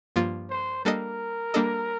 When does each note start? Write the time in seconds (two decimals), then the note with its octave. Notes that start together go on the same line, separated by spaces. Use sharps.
0.16 G2 F3 A#3 F4
0.50 C5
0.85 G3 A#3 D4 A4 A#4 D#5
1.54 G3 A#3 D4 A4 D#5